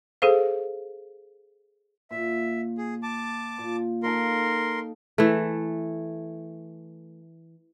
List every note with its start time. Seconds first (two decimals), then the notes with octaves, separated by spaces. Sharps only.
0.22 G#4 A4 C5 F5
2.11 A#2 E5
2.78 G#4
3.03 A5 D6
3.58 A#2
4.03 A#3 D#4 A4 A#4 C6
5.18 E3 A3